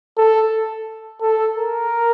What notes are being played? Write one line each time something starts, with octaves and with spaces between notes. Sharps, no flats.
A4
A4
A#4